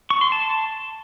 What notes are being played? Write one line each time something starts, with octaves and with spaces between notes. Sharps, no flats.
C#6
C6
A5